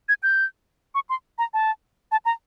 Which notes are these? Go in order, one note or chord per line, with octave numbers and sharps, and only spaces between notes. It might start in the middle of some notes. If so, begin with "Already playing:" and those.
G#6
G6
C#6
C6
A#5
A5
A5
A#5